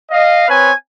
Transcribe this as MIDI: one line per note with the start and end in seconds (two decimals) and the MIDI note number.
0.11 0.45 75
0.11 0.45 77
0.49 0.71 60
0.49 0.71 71
0.49 0.71 73
0.49 0.71 80